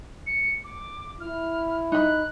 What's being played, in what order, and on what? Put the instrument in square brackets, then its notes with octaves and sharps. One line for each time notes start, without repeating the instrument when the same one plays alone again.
[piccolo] C#7
D6
[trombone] E4 [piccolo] F6
[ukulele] D#4 B5 [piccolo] F#6